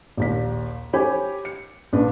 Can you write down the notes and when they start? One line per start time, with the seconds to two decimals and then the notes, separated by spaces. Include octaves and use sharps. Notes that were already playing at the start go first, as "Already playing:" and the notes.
0.17 A#1 D#2 B6
0.93 G4 C5 C#5 G5 G#5 B5
1.45 C#7
1.93 A#1 D4 B4